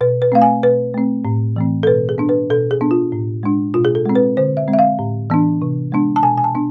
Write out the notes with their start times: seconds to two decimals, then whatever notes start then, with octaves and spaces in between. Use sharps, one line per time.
0.01 B2 B4
0.22 B4
0.32 A3 C4 F5
0.42 G#5
0.63 B2 B4
0.94 A3 C4
1.25 A2
1.56 E3 A3 C4
1.83 A4
1.87 B2 B4
2.09 G#4
2.18 B3 D4
2.29 B4
2.50 B2 A4
2.71 G#4
2.81 B3 D4
2.91 F4
3.12 A2
3.43 G#3 D4
3.74 B2 F4
3.85 G#4
3.95 A4
4.06 G#3 C4
4.15 B4
4.37 D3 C5
4.57 E5
4.68 G#3 C4
4.73 E5
4.79 F5
4.99 A2
5.30 E3 B3 D4
5.62 C3
5.92 G#3 B3 D4
6.16 A5
6.23 B2 G#5
6.37 G#5
6.44 A5
6.55 B3 D4